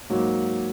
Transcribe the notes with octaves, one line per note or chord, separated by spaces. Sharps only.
G#2 F#3 A#3